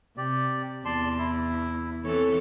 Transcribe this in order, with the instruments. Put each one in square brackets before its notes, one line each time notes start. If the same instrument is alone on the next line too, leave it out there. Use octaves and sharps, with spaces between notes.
[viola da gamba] C3 [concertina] G4 D5
[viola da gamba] E2 [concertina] D5 A5 C6
[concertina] E4
[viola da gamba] E3 C4 A4 [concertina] C#5